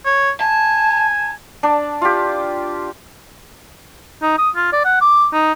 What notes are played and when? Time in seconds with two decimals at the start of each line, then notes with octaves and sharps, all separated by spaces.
0.06 C#5
0.41 G#5 A5
1.63 D4
2.02 F4 G4
4.22 D#4
4.38 D#6
4.56 F4
4.73 D5
4.85 F#5
5.01 D6
5.33 D#4